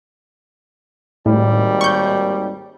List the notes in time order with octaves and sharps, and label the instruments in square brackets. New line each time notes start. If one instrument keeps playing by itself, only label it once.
[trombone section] G#1 D#2 G3 [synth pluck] A2
[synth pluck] C#6 G6